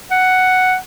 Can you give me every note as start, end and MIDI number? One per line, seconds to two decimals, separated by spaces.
0.11 0.76 78